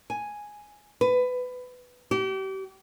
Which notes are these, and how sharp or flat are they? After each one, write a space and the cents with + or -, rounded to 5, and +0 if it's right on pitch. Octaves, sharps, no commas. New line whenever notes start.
G#5 +0
B4 +20
G4 -35